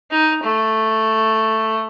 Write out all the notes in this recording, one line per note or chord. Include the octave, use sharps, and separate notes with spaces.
D#4
A3